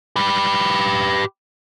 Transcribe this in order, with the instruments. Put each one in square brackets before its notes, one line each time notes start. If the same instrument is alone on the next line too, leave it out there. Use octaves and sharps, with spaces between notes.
[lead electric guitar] G4 B4